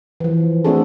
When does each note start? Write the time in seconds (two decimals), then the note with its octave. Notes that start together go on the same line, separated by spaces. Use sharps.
0.20 E3 F3
0.64 A3 C4 D4 F#4 G#4 A4